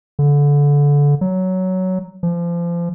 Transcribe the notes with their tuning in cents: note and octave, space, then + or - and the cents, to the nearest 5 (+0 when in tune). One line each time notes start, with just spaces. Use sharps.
D3 -25
F#3 +10
F3 -30